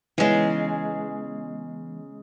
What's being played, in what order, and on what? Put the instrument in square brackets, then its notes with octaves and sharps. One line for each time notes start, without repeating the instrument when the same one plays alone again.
[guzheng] C#3 G#3 [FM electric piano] E3 B3 C#4